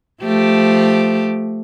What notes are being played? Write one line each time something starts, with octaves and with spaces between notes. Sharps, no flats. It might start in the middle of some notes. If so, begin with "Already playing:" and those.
F3 A3 G4